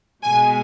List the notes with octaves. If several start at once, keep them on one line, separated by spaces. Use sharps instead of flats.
B2 G#3 G#5